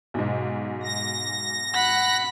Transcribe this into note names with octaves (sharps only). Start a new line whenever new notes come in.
B1 G#2
A#6
F#5 B5 B6